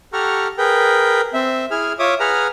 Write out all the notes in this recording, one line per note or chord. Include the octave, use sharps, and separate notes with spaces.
G4 A4 F#5 A#5 C#6 F6
G#4 A#4 B4 G5
C4 E5
E4 G#4 G#5 F6
F4 C#5 E5 D6 D#6
G#4 B4 F#5 G#5 A#5 F6